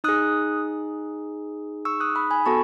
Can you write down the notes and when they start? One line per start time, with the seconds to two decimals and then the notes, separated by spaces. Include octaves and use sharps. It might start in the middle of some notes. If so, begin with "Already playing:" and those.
0.04 D#4 G#4 D#6 F#6
1.85 C#6 E6
2.00 D#6 F#6
2.16 B5 D#6
2.31 G#5 B5
2.46 B3 F#4 A4 A5 C#6